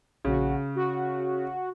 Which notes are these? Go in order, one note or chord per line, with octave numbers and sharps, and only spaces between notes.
A#1 C#3 F#4
F#4